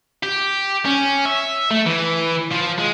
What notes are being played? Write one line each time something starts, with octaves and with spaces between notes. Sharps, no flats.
G4
C#4
E5
A3
E3
F3
G#3